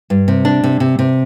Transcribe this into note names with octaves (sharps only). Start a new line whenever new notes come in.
G2
C3
D4
C3
C3
C3